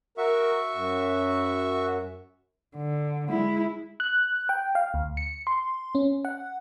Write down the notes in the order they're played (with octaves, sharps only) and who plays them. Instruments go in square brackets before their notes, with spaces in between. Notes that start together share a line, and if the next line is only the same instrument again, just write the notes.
[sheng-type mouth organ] F#4 E5 C#6 [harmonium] A#4
[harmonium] F#2
[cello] D3
G#3 E4
[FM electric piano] F#6
G5
F5
D2
C#7
C6
C#4
F#5